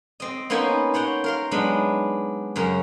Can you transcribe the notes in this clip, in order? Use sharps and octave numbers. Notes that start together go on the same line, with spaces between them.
C4 D#5
A#3 B3 C#4 D#4 C5 G#5
C5 C#5 F#5 G5 A#5
A#4 F5 C6
F#3 G#3 B3 D4 D#4
F#2 C#3 A#4 A#5